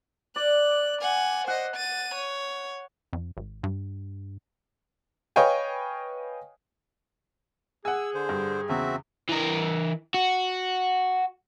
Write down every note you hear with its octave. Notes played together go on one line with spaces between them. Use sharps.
D5 F#6
F#5 G#5
C5 D#5 F#5
A6 D#7
C#5
F2
G#1
G2
B4 C#5 D#5 F5 G5 G#5
G#4 F#5 G#5 E6
D3 C5
G2
E2 C#3 C4 F#4 E5
E3 A#4
F#4